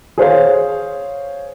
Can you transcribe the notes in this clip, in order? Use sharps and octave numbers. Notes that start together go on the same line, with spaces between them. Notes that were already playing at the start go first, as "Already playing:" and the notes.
G#4 C5 C#5 F5